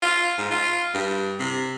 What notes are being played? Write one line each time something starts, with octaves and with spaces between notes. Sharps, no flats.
F4
G#2
F4
G2
C3